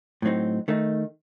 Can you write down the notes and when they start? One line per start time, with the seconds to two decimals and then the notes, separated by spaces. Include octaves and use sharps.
0.22 A2 F#3 C4 D#4
0.68 D#3 A3 D#4